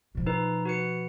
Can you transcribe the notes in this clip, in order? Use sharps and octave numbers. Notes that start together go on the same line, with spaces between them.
B2 F3
D#4 B4
F#4 B4 C#7